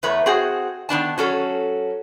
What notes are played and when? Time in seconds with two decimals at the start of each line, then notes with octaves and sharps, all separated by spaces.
0.03 E2 A3 B4 C#5 A#5
0.26 C4 F#4 G#4 F#5
0.89 D#3 B3 D4 A5
1.18 F#3 C#4 A4